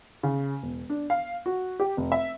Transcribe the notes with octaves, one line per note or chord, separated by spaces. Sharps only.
C#3
E1
D4
F5
F#4
G4
F1
E5